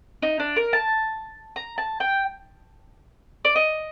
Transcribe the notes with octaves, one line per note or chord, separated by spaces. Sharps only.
D#4
D4
A#4
A5
A#5
A5
G5
D5
D#5